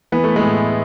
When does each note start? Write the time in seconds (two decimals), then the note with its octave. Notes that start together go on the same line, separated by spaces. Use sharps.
0.12 E3 B3
0.24 A3
0.36 G#3 B3
0.41 A2